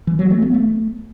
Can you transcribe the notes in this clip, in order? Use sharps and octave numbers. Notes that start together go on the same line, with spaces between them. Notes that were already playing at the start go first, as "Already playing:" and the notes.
E3
F#3
A3
B3
A3